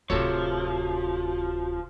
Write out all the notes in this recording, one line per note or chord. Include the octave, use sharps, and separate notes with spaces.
D1 C3 F3 F4 F#4 A4 C#5